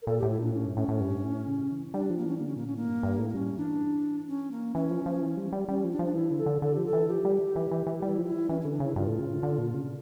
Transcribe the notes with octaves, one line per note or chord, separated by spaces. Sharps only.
A#4
A#2 A4
A2 G4
E4
A#2 D4
A2 C#4
G2
A2 C#4
A2
G2
A2
C#3
E3
G3 D4
F3
A#3
E3 C#4
D3 A#3
C#4
A#2 A#3
C#4
A2 A#3
G2
G2
A2
A#3
G3 C#4
E3 D4
C#4
A#3
E3 C#4
F3
F3
E3
G3
G3
G3 C#4
F3
D4
F3
D4
E3 E4
D3
A4
D3
D3 A4
F3 G4
A4
E3
F3 G4
G3
E3
E3
E3
G3 E4
F3
E4
E3 C#4
D3 C#4
D4
C#3 E4
G2 F4
A2
C#3
D3
D3
A#2
C#3